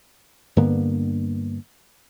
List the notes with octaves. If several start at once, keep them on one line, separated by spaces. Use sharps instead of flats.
G2 D3 A#3 B3